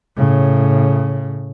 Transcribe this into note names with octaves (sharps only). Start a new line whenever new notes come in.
A2 C#3